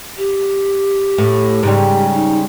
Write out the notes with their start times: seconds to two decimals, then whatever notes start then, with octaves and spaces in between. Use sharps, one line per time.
0.18 G4
1.18 A2
1.63 G#2 C#3 G3
2.14 D#4